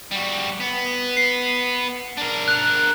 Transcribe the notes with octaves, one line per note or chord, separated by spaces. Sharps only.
G3 F#4
B3
C7
D4 A#4
F#6